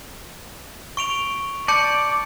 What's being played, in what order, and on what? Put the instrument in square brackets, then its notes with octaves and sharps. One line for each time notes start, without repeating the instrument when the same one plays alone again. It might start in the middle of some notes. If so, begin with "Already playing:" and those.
[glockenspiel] C#6 D7 F7
[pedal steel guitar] D5 [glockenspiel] A5 G6 C#7